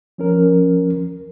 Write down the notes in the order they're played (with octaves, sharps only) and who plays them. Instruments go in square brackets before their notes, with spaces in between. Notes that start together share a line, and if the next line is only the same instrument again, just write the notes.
[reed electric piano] F3 C#4 A#4